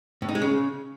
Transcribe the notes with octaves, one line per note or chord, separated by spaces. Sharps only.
A2
D#4
G#3
C#3